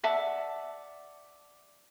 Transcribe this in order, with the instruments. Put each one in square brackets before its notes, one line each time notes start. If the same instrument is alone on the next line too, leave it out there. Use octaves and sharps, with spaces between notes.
[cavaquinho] D5 E5 F#5 A5